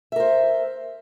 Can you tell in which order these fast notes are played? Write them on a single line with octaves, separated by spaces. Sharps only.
E5 A#4 C5